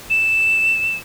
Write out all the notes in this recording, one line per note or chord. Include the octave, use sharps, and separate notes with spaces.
E7